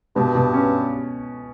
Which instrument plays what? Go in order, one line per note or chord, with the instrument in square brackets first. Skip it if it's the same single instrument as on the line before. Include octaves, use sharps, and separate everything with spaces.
[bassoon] G2 [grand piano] B2
[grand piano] B2
C#4